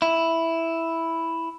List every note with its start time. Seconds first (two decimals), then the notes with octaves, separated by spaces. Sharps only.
0.02 E4